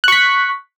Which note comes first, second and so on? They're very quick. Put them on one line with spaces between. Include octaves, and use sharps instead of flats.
F#6 C#6 B6